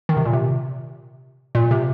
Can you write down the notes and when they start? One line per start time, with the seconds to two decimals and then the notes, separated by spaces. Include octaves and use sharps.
0.09 D#3
0.17 C3
0.26 A#2
0.33 C3
1.55 A#2
1.71 C3